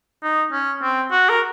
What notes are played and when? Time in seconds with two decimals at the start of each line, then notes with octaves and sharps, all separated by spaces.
0.23 D#4
0.52 C#4
0.82 C4
1.11 F#4
1.29 A#4